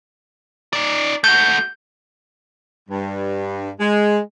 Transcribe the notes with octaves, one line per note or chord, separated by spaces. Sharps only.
D#4 D5
A3 F#4 G6
G2
G#3